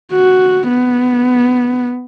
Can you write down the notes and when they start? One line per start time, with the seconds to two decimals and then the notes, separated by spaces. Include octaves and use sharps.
0.13 F#4
0.68 B3